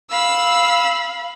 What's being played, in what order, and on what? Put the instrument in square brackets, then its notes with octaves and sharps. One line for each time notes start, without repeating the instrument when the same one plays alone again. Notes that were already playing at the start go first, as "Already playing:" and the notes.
[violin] F5 B5 [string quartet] E6